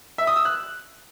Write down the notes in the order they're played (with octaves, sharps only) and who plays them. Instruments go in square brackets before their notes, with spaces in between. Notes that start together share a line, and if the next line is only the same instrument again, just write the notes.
[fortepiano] E5
D#6
E6
F#6